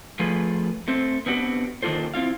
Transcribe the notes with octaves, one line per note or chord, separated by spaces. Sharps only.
F3 A3 F4 G#4 B4
A3 C4 C5
B3 C4 D4 F#4 G4 B4
D#3 A#3 D4 F4 A4 C5
C4 E4 F4 F5